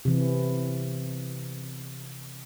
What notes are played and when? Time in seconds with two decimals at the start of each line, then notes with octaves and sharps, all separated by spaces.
0.05 C3 E3